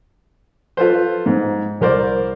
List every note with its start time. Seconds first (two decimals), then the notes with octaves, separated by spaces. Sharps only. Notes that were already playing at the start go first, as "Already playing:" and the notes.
0.77 F4 A4 B4 C5
1.26 G#2
1.81 C2 A#4 C5 D5